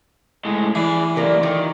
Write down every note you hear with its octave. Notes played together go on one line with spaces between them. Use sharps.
A2 G#3
E3 G#4 D5
F#2 C3 A#3 A#4 D5
D#3 F4 G4